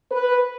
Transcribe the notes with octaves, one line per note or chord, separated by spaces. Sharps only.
B4